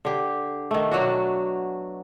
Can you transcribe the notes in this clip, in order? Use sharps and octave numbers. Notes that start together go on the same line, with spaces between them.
D3 G4
D#3 A3
B2 F#3 D4 F#4